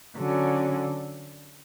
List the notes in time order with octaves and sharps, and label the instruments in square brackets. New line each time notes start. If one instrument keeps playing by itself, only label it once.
[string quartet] D3 F#3 C#4